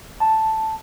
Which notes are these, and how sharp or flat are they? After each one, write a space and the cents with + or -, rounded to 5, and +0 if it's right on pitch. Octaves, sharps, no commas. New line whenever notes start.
A5 +0